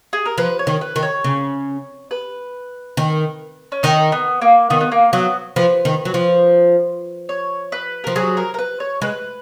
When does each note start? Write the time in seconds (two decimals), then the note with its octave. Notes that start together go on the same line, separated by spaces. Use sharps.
0.13 G#4
0.25 A#4
0.38 F3 B4
0.59 C#5
0.67 D#3
0.81 B4
0.96 D#3
1.03 C#5
1.24 C#3
2.11 B4
2.97 D#3
3.72 C#4
3.83 D#3 D#4
4.12 B3
4.42 A#3
4.70 D#3 B3
4.81 B3
4.92 A#3
5.13 F#3 B3
5.56 F3 B4
5.85 D#3
6.05 F#3
6.14 F3
7.29 C#5
7.72 B4
8.04 F3 A#4
8.15 F#3 G#4
8.37 A#4
8.54 A#4
8.59 B4
8.80 C#5
9.02 G#3 B4